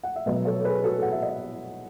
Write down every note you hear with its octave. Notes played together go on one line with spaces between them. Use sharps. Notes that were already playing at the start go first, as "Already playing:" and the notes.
F#5
E5
B2 F#3 B3 B4 D#5
A4 C#5
G#4 B4
F#4 A4
F#5
E5
D#5